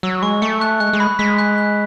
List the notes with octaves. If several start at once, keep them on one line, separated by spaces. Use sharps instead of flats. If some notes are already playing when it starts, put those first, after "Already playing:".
F#3 E6
G#3 C#6
A3 C#7
F#6
G#3 F#6
G#3
B5
G#3 B6
F#6
F#6